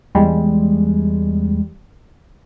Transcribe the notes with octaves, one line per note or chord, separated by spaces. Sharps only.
E2 G3 G#3